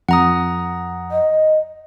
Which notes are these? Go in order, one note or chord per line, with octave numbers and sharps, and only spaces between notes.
F2 F#5 A#5 D#6
D#5